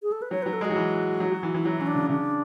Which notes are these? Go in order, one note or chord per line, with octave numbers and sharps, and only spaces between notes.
G#4
A4
B4
F#3 C#5
F#3 B4
A4
G#3 F#4
F#3
E3
F#3
F#3
E3
E3
F#3 E4
E3 C#4
D4
C#3
C#3 D4